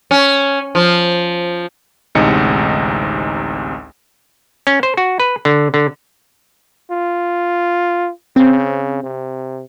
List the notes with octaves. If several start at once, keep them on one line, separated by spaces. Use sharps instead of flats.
C#4
F3
A1 D2 C3 G#3 D#4 C#7
C#4
C5
F#4
B4
D3
D3
F4
C#3 C4
C3